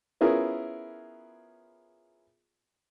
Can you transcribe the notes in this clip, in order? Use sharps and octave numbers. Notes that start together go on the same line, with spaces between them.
B3 C#4 E4 F4 G#4 A#4